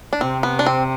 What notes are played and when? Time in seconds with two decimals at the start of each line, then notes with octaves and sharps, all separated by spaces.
0.13 D4
0.21 C3 C4
0.43 B3
0.59 D4
0.66 C4